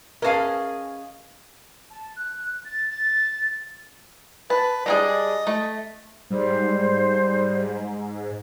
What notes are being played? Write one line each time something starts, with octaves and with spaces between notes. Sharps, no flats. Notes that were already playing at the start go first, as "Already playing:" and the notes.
C#4 F#4 G#4 A#4 B4 D#5 F5 A5
A5
F#6
A6
A6
B4 A5
G3 D4 G#4 D#5
A3
G#2 G3 C5